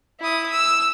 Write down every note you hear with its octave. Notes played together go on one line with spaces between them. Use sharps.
E4 D#6
E6